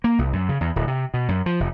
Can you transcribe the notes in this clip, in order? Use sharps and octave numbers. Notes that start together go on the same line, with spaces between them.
A#3
C2
F#2
C#3
E2
D1
C3
B2
F#2
F3
F1